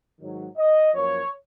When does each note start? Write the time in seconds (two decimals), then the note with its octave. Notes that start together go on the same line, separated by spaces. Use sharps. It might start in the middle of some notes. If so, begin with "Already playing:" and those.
0.20 G#2 D#3 F#3
0.57 D#5
0.95 F#2 F3 A#3 C#5